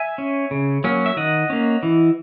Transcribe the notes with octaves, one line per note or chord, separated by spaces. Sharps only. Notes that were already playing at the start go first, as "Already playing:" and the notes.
Already playing: E5 G#5
C#4
C#3
F#3 A#3 C#4
E5
D#3 D#5 F#5
A#3 C#4
E3